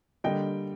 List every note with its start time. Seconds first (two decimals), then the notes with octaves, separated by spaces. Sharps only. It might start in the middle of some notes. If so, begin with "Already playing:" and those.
0.24 D3 G3 A#3 D#5 G5